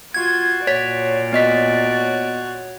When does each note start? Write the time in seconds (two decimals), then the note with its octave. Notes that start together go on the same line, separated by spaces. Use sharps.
0.14 F4 F#4 G#6
0.67 A#2 C#5 D5 B6
1.33 B3 F#4 D#5 B6